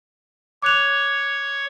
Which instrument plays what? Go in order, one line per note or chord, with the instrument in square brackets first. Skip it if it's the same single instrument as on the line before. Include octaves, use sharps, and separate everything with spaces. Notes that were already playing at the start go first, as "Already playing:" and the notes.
[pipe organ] C#5 [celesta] D6 F#6 F7